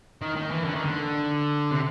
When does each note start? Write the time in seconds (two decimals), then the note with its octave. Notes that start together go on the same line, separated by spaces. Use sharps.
0.22 D#3
0.36 D#3
0.51 E3
0.64 D3
0.75 D#3
0.85 D3
1.71 C3